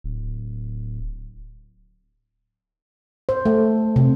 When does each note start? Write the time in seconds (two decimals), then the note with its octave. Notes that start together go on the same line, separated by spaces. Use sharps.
0.04 D1
3.29 C5
3.45 A3
3.96 C3